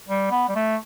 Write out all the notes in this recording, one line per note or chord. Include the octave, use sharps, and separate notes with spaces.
G3
B3
G3
A3